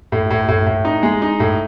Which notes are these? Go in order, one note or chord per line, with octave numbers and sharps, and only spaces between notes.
A2
A2
A2
A2
D#4
G#3
D#4
A2